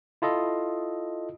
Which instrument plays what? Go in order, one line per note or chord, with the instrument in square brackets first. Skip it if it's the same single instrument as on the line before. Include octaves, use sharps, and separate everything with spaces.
[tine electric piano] E4 F4 A4 D#5